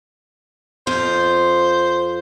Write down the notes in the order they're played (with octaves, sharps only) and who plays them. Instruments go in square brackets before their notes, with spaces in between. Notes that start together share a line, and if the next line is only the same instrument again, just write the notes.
[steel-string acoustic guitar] F2 F4 [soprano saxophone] C5